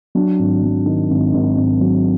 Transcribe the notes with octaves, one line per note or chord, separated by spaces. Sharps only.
F#3 D4
G#1
F#3
D#3
G#1
G#1
G#1
F#3